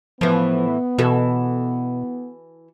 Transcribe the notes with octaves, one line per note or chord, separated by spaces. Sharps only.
A2 E3 F3 B3
B2 E3 F#4 A4